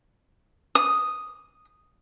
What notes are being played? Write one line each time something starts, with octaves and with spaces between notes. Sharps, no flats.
D#6